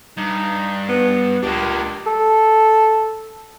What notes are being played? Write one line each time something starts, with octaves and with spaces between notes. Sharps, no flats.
G2 D#4
B3
C#2 A#3 D4 G4
A4